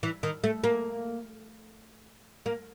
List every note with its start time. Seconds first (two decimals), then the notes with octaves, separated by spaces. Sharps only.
0.03 E3
0.23 D#3
0.44 A3
0.64 A#3
2.46 A#3